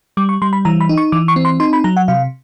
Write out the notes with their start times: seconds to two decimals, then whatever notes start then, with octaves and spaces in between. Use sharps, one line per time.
0.17 G3 D6
0.29 C#6
0.42 G3 C6
0.53 B5
0.65 E3 A#5
0.81 B5
0.89 D#4
0.98 C#6
1.12 E3 D6
1.28 C#6
1.36 C4
1.45 C6
1.60 D#4 C6
1.73 B5
1.84 F#3 A#5
1.97 F#5
2.08 C3 F5